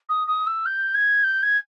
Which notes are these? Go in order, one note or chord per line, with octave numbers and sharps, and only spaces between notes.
D#6
D#6
E6
G6
G#6
G6
G#6